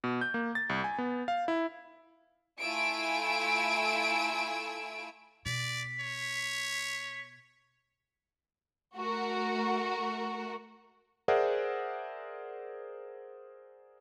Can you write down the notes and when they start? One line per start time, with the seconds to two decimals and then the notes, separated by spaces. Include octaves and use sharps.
0.04 B2
0.21 G6
0.34 A#3
0.55 A6
0.69 C2
0.84 G#5
0.98 B3
1.28 F5
1.48 E4
2.60 A3 E4 F4 G#5 E6 D7
5.46 B2 D5 B6
6.00 C#5
8.95 A3 F#4 A#4
11.28 G#4 A#4 C5 D5 E5 F#5